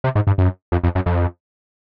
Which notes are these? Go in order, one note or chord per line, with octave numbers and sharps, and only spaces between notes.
C3
G#2
G2
F#2
F2
F2
F#2
F2